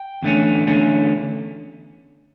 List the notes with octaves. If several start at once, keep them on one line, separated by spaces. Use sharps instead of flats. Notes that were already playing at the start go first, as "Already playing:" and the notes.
Already playing: G5
E2 D3 A3 C#4
E2 D3 A3 C#4